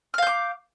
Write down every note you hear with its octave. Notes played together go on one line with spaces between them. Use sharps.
F5 D6 F6 G6